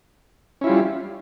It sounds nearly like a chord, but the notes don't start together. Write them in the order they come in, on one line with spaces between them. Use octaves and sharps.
C#4 E4 F4 G3